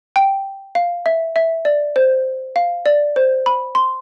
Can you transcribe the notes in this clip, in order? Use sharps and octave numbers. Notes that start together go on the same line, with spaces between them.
G5
F5
E5
E5
D5
C5
F5
D5
C5
B5
C6